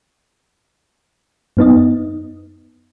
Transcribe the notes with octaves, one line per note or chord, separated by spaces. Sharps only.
F#2 B3 D#4 D#5